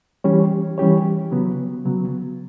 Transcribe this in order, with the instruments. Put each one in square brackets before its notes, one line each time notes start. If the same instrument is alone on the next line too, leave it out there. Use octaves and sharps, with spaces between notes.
[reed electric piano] E3 G3 C#4 G4 C#5
E3 G3 C#4 G4 C#5
C#3 F#3 B3
C#3 F#3 B3